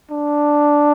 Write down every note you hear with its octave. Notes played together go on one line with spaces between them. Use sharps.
D4